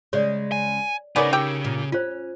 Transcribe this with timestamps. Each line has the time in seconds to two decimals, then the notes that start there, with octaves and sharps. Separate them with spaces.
0.13 C#3 G#3 C#5 D5
0.52 G#5
1.16 C#3 B3 C#4 D#4 A#4 D5
1.33 G4 G5 E6
1.64 A#2
1.92 C#4 F4 C5